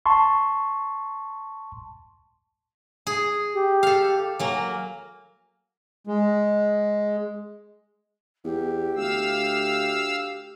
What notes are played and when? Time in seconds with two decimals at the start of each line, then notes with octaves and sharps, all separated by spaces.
0.06 A5 C6 C#6
3.07 G#4
3.54 G4
3.83 A4 F5
4.39 F#3 A#3 G#5
6.07 G#3
8.45 E2 G4
8.96 D2 F5 E6